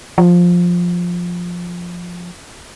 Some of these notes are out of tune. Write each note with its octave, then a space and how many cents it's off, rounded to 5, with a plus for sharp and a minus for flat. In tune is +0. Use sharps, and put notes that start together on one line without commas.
F3 +10